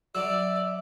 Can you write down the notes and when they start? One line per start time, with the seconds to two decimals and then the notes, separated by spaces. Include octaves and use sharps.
0.15 F#3 D5 E5 E6